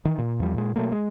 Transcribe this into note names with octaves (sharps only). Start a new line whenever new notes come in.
D#3 E3
A#2
E2 F3 G3
A#2 G#3
B2 F#3 A3 A#3
G#3